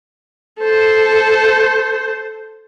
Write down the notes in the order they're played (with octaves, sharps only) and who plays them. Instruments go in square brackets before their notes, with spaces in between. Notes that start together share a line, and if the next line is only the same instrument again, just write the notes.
[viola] A4 C5